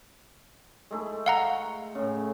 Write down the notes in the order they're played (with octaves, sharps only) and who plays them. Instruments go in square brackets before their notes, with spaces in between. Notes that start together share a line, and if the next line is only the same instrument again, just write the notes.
[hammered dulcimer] G#3 A3 E4
[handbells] F5 F#5 A#5
[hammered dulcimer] A2 C#3